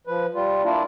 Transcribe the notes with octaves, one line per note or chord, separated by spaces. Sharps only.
F3 B4
G3 F4
A#3 D4 E4 F4